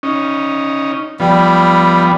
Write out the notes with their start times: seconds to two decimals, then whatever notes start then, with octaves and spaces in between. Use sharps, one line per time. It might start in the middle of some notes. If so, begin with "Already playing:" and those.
0.03 C#4 D#4
1.20 F3 G3 B3